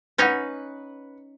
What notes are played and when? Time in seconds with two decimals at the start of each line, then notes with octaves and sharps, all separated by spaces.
0.18 C#4 D#4 B4 C#5 F#5